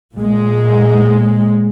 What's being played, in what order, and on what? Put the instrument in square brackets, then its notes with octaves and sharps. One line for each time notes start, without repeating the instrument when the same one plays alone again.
[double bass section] A#2 G#3